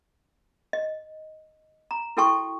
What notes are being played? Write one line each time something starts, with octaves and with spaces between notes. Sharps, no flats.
D#5
A#5
E4 F#4 A4 G5 A5 C#6